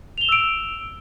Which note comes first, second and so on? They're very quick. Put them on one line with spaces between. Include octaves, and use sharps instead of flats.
F7 G7 E7 E6 D7